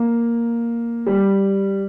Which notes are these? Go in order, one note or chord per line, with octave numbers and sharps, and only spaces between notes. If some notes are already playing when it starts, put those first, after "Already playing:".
Already playing: A#3
G3